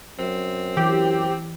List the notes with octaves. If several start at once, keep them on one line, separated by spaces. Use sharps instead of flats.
F#2 C4
E3 G4